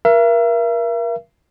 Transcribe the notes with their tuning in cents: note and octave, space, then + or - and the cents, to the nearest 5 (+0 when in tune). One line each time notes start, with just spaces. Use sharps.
A#4 +30 E5 +40